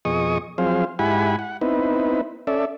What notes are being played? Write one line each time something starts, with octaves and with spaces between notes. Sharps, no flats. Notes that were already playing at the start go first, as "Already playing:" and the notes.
F2 B2 G#4 D#5 C#6 D#6
F3 F#3 C4 G#4 C5 F5
G#2 E4 G4 F#5 G#5 B5
F#5
B3 C4 D#4 E4 B4
C#4 A4 D5 E5